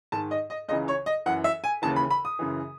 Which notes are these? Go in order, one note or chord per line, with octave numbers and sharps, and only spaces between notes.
G#2 D#3 A5
D#5
D#5
C#2 C#3 E3 D#5
C#5
D#5
F#2 E3 F#5
E5
G#5
D#2 C#3 E3 A5
B5
B5
D#6
F#2 C#3 E3